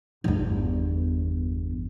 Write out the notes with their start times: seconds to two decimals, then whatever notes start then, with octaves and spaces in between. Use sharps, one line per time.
0.24 G1 E2